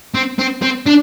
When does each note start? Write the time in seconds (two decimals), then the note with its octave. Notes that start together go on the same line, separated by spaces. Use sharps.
0.15 C4
0.39 C4
0.62 C4
0.86 D4